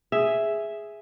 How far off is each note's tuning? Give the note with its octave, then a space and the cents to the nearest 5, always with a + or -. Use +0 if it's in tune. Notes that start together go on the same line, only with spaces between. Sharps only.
G#4 +0 E5 +0